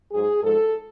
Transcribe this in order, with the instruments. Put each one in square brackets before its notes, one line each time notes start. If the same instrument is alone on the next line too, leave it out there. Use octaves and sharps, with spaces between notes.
[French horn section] G#2 F#3 G#4
G#2 F3 G#3 A4